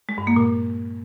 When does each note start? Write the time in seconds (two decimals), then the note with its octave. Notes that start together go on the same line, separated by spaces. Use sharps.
0.09 G#3
0.18 G2
0.27 A#3
0.36 A#2